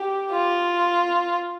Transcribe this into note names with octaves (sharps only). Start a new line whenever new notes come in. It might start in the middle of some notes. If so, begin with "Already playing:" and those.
Already playing: G4
F4